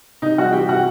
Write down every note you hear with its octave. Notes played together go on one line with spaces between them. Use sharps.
C3 D#4 D#5
G3 F#4 F#5
E3 G4 G5
C3 F#4 F#5